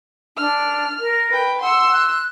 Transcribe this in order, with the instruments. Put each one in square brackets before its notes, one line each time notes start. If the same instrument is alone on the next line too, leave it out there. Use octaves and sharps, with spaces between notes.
[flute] D4 [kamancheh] F6
[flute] A#4
[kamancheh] B4 G5
[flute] F#5 [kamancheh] C6 E6
[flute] F#6